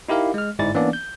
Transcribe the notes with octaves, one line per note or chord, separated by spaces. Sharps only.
D#4 E4 G4 A#4 F5
G#3 F6
G1 G#2 E4 D5 A6
E3 A#3 B3 C#4 D4 D5
G6